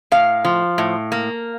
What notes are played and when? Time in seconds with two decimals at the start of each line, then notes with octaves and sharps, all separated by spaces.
0.12 A2 F5
0.45 F3
0.78 A2
1.12 A#3